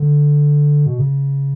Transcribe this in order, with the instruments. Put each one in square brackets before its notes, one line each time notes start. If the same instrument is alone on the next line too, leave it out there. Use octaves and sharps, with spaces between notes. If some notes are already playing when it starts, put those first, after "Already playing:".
Already playing: [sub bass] D3
B2
C#3